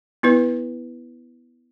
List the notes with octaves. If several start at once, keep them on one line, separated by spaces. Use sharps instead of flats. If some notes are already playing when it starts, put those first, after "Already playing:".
B3 E4 B4